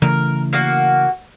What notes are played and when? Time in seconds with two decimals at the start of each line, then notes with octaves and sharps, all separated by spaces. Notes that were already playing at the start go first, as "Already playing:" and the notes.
0.02 C#3 E3 A3 A#4
0.53 A#3 F#4